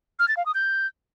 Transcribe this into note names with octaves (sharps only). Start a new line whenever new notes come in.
F6
A6
F5
D#6
G6